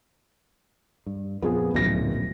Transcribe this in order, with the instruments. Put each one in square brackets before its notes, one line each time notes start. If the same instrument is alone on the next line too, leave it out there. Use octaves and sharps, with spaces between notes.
[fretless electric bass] G2
[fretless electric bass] F2 A#2 F3 [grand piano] B3 G#4
[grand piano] D1 A#6 [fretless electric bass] A#1 F#2 B2